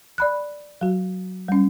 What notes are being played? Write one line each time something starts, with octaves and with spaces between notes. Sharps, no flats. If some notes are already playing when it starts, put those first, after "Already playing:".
D5 B5 F#6
F#3 F#4
G3 C#4